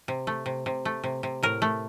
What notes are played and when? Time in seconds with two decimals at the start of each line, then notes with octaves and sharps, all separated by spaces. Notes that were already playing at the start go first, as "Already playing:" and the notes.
0.08 C3
0.27 A3
0.46 C3
0.66 C3
0.85 A3
1.04 C3
1.23 C3
1.43 A2 A#4
1.62 A3